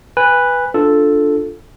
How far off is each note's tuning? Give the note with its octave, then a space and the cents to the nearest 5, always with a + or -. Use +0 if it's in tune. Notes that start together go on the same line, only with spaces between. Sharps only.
B4 +0 G#5 -25
D4 +0 F4 +0 A4 +0